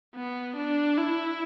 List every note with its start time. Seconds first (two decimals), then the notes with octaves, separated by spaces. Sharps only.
0.15 B3
0.56 D4
0.97 E4